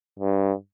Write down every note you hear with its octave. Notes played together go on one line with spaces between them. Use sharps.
G2